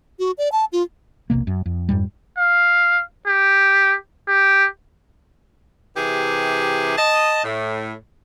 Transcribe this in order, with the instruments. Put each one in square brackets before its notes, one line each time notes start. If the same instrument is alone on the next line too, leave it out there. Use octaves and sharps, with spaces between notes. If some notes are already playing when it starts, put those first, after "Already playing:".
[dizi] F#4
D5
A5
F4
[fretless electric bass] E1 B1 C3 A#3
F#2
F2
F2 G#2 G3
[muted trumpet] F5
G4
G4
[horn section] C3 E3 G4 G#4
D#5 A5
A2